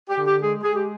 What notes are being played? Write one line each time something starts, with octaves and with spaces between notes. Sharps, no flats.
G4
D3
G4
G#3 G#4
G#3 G#4
G4